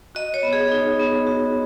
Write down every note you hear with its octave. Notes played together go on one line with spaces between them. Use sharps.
F#4 D#5
C#5
B3
G#4
D#4
B3
F#4